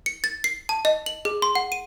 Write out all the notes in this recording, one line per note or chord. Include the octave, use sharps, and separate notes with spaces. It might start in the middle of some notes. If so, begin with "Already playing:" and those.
C#7
A6
C7
A5
D#5
F#7
G#4
C6
F#5
D#7